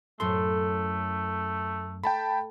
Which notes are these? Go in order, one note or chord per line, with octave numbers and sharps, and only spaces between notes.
F#2 A2 A3 C#4 A4 C6
A3 G5 A5 B5